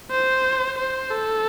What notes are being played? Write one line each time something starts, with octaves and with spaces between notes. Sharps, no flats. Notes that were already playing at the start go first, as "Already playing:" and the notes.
C5
C5
A4